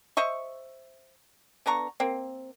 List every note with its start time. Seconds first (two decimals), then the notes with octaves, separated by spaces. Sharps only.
0.17 C5 D#5 E5 C#6
1.66 D3 B3 A#5 C#6
2.00 A#3 C4